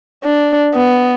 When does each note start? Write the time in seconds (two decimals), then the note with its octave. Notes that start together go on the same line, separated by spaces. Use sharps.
0.24 D4
0.74 B3